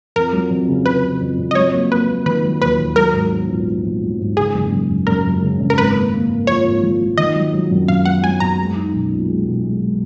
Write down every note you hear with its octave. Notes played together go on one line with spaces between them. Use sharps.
F2 A#4
F#3
F2
C#3
C#3 B4
C#3
F2
F2
D#5
F#3 C#5
A#3
A#3 B4
A#3
D#3 B4
F#3
D#2 B4
D#2
F#3 A#4
G#2
B3
A#1
F#3
A#1
F#3
G#2
C#3 G#4
F#1
F#2
F#1
F#2 A#4
F#1
C#3
F#2
A#4
G#1 B4
A#3
A#3
G#1
F3 C#5
G#1
F3
F3
D#3 D#5
F#3
F#3
F#2
F#2 F5
B3 F#5
F#3 G#5
F#2 A#5
G#3
D#4
B1
A#2
G#3
B1
G#3
G#3